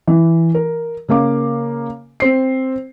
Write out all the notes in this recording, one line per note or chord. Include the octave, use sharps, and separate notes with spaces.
E3
A#4
C#3 A#3 F5 D6
C4 C7